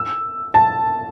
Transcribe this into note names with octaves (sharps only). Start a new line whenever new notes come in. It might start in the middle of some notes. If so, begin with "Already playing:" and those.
Already playing: E6
A5